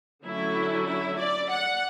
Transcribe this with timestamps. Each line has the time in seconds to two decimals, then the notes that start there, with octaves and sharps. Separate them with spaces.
0.25 D3 F#3 A3 C#4 E4
0.87 E4
1.19 D5
1.51 F#5